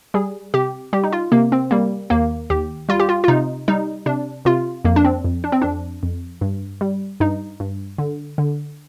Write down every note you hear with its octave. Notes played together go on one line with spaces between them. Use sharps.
G3 G#4
C3 G4
G3 G4
D#4
F4
C3 A#3
C4
G3 A#3
D#2 A#3
D#2 G4
G3 F4
G4
F4
F4
C3 D#4
G3 D#4
C3 D4
C3 F4
F2 A#3
D4
C4
F2
D4
C4
F2 D4
F2
G2
G3
G2 D#4
G2
D3
D3